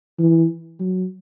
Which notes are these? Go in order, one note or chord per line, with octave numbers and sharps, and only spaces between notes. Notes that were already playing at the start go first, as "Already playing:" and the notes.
E3
F#3